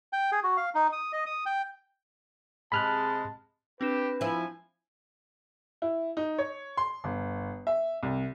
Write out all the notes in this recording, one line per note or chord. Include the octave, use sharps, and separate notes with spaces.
G5
G#4
F#4
F5
D#4
D#6
D#5
D#6
G5
C3 G#3 A5 B5 F6 F#6
C4 D4 G4 B4 E7
F3 E4 G#5
E4
D#4
C#5
C6
G1
E5
C2